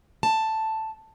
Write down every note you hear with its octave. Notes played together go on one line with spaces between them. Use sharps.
A5